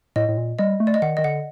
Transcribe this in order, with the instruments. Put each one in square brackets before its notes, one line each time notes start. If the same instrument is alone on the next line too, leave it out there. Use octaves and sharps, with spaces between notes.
[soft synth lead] A2 [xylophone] D#5
[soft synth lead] A2
A#2
[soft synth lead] G3 [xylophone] D#5
[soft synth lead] A3
[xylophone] D5
D#5
[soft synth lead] D#3 [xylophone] F#5
[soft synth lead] D#3 [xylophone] D#5
[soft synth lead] D3 [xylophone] F#5